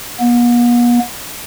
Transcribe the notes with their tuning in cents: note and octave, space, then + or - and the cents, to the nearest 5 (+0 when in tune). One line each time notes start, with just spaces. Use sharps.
B3 -45